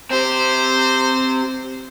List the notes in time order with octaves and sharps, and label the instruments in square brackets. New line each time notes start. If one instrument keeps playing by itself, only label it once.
[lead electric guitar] C4 G4 [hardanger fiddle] C5